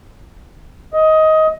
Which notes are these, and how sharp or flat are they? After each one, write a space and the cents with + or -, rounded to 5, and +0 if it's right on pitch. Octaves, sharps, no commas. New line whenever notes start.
D#5 +15